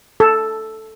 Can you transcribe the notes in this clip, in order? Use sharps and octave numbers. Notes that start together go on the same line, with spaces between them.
A4